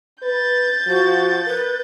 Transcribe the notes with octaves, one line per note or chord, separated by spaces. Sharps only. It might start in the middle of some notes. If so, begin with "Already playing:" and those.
B4 G6 A6
F3 F#4
A#4 B4